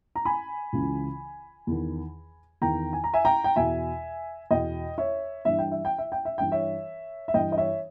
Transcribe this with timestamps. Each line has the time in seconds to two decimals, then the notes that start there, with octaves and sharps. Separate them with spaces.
0.16 A#5
0.25 G#5 B5
0.73 C#2 C#3 E3
1.67 E2 D#3
2.62 E2 D#3 G5 A#5
2.93 G#5
3.04 A#5
3.14 E5 G#5
3.25 G5 A#5
3.44 G5
3.56 E2 B2 E5 G#5
4.51 E2 B2 D#5 G5
4.98 C#5 E5
5.45 G2 E3 E5
5.59 G5
5.72 E5
5.85 G5
5.98 E5
6.12 G5
6.25 E5
6.38 G2 E3 G5
6.52 C#5 E5
7.28 E5
7.34 G2 E3 D#5 G5
7.52 D#5
7.58 C#5 E5